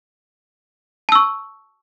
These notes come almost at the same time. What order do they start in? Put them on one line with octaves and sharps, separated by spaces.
A5 E6 C#6